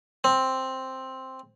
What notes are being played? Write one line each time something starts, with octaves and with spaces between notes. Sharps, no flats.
C4